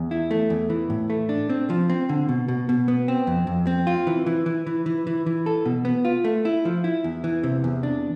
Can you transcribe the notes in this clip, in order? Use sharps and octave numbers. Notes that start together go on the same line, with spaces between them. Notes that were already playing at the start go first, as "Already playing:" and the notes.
Already playing: E2
E4
A3
E2
E3
A2
A3
D4
C4
F3
C4
D3
B2
B2
B2
B3
C4
F2
F2
C4
F4
E3
E3
E3
E3
E3
E3
E3
A4
B2
B3
F4
A3
E4
F3
E4
E2
E3
C3
E2
D4